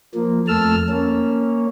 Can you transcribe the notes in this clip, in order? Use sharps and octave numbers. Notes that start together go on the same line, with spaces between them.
F3 A#3
F2 A3 A5 E6 F6
A#3 C#4